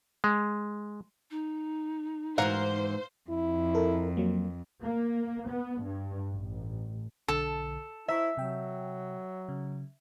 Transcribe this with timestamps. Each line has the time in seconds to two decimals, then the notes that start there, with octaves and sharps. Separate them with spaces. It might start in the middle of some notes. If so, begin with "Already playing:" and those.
0.24 G#3
1.31 D#4
2.38 G#2 E3 F#4 A#4 C5 F5 F#5
3.30 F2 E4
3.75 A4 A#4
4.17 F#3 A#3
4.82 A#3
5.48 B3
5.81 G2
6.31 A1
7.28 B1 D3 A4
8.08 E4 C5 E5 A#5 C#6
8.37 C3 F#3 G5
9.49 C#3